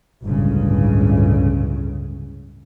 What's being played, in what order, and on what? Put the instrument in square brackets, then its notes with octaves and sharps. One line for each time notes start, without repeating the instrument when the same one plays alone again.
[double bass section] G1 C#2 A2 C#3